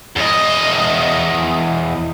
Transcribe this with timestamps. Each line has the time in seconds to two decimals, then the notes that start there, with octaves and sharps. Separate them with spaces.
0.16 E2 D#5